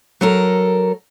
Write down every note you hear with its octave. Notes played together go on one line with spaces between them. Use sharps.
F#3 A4 A#4